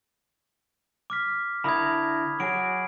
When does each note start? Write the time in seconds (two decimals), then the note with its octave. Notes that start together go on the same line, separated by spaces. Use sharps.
1.10 D6 F6 B6
1.64 D3 E4 A#4 B5 D#6 G#6
2.40 F#3 F#4 G#4 D7